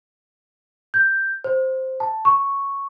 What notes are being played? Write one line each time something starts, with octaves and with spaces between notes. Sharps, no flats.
G6
C5
A5
C#6